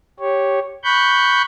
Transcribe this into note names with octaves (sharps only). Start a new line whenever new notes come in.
G4 C#5
B5 C#6 F#6 G6